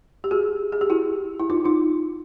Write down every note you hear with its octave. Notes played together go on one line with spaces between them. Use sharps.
G4
F#4 G#4
G#4
G4
E4 F#4
E4
D#4 F4
D#4 F4